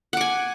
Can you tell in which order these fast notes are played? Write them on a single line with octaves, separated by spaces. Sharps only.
F#5 D6 G#5